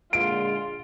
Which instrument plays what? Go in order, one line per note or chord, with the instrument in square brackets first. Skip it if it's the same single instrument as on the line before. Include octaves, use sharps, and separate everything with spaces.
[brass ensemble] A#2 D3 G#3 [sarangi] F4 [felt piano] D7